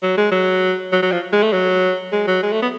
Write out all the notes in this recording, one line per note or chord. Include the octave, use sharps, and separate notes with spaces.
F#3
G#3
F#3
F#3
F#3
F3
G#3
A3
F#3
G#3
F#3
G#3
A3
B3